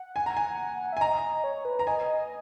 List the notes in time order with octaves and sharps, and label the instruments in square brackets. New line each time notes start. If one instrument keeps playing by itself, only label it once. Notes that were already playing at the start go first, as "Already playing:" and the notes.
Already playing: [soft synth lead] F#5
[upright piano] G#5
A#5
G#5
[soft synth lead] E5
[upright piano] G#5
[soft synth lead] D#5 [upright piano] A#5
[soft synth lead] C#5
B4
[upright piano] A#5
[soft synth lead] D#5 [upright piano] G#5